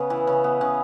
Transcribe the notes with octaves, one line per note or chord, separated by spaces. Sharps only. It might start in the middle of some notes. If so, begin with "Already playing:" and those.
Already playing: C#3 B3
E3
C#3
B3
C#3